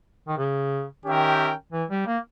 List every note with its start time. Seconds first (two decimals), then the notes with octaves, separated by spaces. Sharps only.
0.28 D#3
0.38 C#3
1.05 D#3 C#4 G4 A#4 E5 G5
1.73 E3
1.90 G3
2.07 A#3